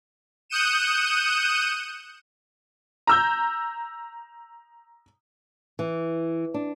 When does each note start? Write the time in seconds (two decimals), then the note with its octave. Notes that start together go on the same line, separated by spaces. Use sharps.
0.49 D#6 F#6 G6 C#7 D#7 E7
3.07 A#5 E6 G6
5.79 E3
6.54 D4